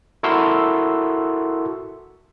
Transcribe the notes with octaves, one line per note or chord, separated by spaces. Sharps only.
E4 F#4 A4 A#4 C6 E6